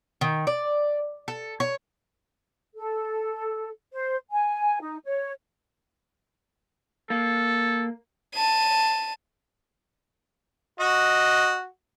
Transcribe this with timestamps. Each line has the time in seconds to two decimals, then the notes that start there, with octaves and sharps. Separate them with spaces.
0.21 D#3
0.47 D5
1.28 A4
1.60 C#5
2.75 A4
3.93 C5
4.31 G#5
4.81 D#4
5.05 C#5
7.10 A#3 A4
8.34 A5 D#7
10.80 F#4 D#5